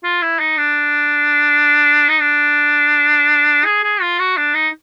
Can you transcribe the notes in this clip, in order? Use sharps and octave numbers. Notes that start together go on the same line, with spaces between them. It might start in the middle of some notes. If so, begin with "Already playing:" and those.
F4
E4
D#4
D4
D#4
D4
G#4
G#4
F4
F#4
D4
D#4